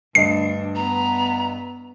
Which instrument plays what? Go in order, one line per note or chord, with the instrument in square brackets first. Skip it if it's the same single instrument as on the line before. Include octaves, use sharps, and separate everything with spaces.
[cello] D2 D4 [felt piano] G2 D#5 [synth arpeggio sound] C7
[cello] B3 [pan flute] A#5